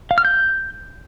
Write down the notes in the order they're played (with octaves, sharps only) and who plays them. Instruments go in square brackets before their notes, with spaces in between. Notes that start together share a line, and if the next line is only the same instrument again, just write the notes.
[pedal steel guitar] F5
F6
G6